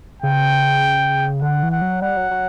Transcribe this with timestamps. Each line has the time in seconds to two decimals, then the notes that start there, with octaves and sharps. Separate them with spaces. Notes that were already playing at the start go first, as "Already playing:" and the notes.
0.22 C#3 G5
1.42 D3 F#5
1.63 E3
1.71 F#5
1.82 F#3
2.02 G3 F#5
2.17 F#3
2.31 F#3